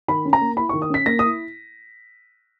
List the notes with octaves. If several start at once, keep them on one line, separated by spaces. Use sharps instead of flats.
D#3 B5
C#4
A#5
A#3
E4 B5
C#6
D#3
D#6
C#4 B6
A#3 A#6
D#6
E4